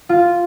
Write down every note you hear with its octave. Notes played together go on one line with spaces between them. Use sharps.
F4